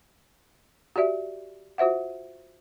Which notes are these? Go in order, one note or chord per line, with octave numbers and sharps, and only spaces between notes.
F#4 G4 D5 E5
F4 F#4 C5 E5 F#5